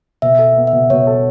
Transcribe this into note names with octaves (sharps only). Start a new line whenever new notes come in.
B2 E5
A4
B3
E5
B2
B2 C#5
A4